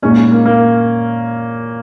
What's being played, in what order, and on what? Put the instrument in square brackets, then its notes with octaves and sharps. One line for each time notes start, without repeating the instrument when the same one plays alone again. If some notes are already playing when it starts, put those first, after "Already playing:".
[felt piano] A#2 G#3 D#4 [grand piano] C#4
[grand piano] A#3
A#3